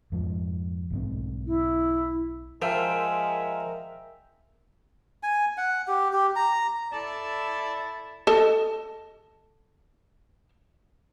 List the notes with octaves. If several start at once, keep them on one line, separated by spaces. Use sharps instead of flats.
F2 G#2 F3
B1 G#2 C4
E4
F3 G#3 A#4 E5 G5
G#5
F#5
G4
G4
A#5
E4 A4 D5 A5
A4 D#5 A5